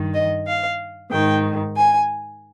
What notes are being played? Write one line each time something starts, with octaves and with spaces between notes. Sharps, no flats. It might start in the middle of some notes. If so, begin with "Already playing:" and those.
Already playing: G2 D#3
D#5
F5
G#2 D#3 G5
G#5